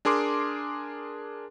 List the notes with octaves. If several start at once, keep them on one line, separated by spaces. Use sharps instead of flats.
D4 G#4 A#4 C6 D6